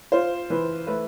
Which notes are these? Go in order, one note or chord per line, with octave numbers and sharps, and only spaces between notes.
F4 C5
E3 B4
A3 B4